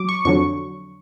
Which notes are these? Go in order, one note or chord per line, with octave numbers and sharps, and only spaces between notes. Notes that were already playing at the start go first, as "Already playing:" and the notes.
Already playing: F#3 D6
C#6
F2 D3 F#3 C#6